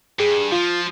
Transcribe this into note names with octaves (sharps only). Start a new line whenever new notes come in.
G2 G#4
F3 F4